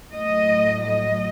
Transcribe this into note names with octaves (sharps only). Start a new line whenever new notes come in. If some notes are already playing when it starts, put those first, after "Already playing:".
A2 F#3 A3 D#5
D#5